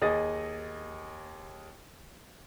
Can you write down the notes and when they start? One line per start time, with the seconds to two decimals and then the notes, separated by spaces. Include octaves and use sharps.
0.02 D#2 G#4 D#5 A6 A#6